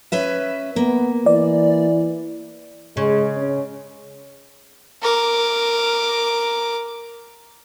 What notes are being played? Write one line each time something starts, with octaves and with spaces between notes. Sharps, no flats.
C#4 B4 E5
A#3 B3
E3 D5
C#3 G#3
C#4
A#4 D6